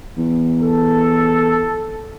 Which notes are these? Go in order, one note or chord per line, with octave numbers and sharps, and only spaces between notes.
E2
A4